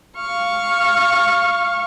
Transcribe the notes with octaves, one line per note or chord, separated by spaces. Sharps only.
F5 C#6